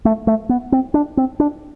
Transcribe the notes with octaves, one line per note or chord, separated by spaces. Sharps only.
A3
A3
B3
C4
D4
C4
D4